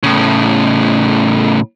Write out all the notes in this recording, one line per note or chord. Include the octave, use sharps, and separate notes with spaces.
A2 C#3